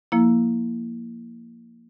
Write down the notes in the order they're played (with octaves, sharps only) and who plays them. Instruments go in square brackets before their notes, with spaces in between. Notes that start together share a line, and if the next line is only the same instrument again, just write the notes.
[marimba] F3 A#3 E4